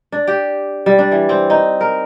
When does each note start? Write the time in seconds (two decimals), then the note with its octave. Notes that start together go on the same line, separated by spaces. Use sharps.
0.12 D4
0.28 G4
0.86 G3
0.99 D4
1.12 E3
1.29 C4
1.50 D#4
1.81 A#4